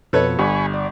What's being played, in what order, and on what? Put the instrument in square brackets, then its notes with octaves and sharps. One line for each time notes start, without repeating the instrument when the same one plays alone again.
[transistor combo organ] F2 B2 [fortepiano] A4 B4 C#5
[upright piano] G1 [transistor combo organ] G#5 B5 C#6
[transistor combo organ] D5